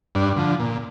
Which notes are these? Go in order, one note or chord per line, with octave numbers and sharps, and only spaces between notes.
G2 D4
D3 F3
A#2